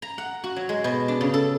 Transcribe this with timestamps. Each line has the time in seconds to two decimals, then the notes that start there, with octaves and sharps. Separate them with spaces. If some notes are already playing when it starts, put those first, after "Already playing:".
0.02 A#5
0.18 F#5
0.44 F#4
0.56 F#3
0.69 G#3
0.84 B2
1.08 D4
1.21 C#3
1.34 A4